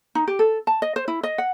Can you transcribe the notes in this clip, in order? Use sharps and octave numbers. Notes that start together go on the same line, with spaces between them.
D#4
G4
A4
A5
D#5
C5
E4
D#5
F#5